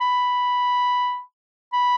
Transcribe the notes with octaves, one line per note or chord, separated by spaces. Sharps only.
B5
B5